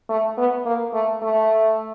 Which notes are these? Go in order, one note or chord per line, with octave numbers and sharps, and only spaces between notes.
A3
B3
A#3
A3
A3